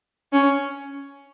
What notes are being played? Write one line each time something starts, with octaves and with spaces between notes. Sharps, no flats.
C#4